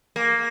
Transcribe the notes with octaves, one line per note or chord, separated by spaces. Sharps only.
A#3